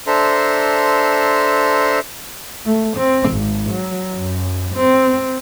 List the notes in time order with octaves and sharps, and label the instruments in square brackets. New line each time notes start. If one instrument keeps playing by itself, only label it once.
[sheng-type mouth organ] D4 A4 C5 E5 A#5 C6
[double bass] A3
C4
G#1
F#3
F#2
C4